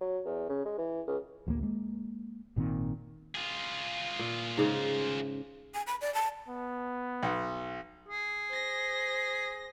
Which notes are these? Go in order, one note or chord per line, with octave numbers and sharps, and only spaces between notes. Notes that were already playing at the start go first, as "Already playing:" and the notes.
F#3
E2
C#3
G#3
E3
C#2
A1 D2 D3 A#3
G#3 A#3
G#1 A#2 D#3 C4
F4 G#4
A#2
G#2 C#3
G#5
B5
D5
A5
B3
B1 F#5
G#4
C5 A#6